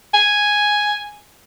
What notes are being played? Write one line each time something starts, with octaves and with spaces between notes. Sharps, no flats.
G#5